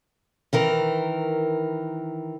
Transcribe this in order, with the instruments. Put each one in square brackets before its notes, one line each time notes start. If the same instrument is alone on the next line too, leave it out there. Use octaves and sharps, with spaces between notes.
[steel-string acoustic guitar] D#3 E3 A#4